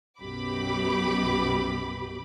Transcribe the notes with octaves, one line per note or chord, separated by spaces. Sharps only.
B1 F#2 B2 G4 B5 D6